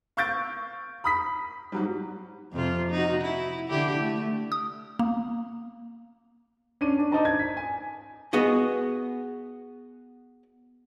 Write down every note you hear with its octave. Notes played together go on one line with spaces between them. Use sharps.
F5 C#6 E6 G6 A6 D7
B5 D#6 B6
G#2 F#3 G3
F2 C3 F4
D#4 F#4
E4
D3 E4 G4
A3
D#6
A#3
C#4 D4 D#7
D4
D#4 C5 D5 A5 A#5
G#6
B6
G#5
B3 F#4 G#4 D#5